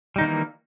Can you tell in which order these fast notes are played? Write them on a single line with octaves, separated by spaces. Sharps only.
G3 D#4 D#3 A#3 E3